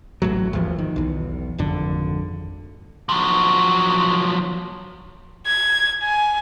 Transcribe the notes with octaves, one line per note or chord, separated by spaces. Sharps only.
A1 A2 F#3
G#1 D#2 E3 F3
D#3
B1 E2
G#1 F2 D3
F3 F#3
G#6
G#5